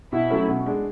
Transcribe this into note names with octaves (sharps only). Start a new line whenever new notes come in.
B2 E4
F#3 A3 C#4
B2
G#3 D4